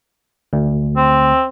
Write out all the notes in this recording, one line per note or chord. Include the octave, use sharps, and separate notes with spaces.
D2
C4